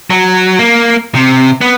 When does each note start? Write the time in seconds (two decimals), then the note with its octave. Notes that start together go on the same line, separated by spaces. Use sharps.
0.10 F#3
0.59 A#3
1.15 C3
1.61 B3